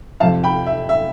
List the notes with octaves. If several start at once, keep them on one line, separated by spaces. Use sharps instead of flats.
F2 C3 F3 F5 A5
G5 B5
E5
E5